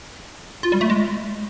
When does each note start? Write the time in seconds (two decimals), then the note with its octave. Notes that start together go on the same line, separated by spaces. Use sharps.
0.63 F4
0.72 G3
0.81 A3
0.90 G#3